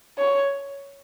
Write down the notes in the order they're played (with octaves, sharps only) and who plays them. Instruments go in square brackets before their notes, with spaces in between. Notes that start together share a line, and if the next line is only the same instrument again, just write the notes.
[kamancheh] C#5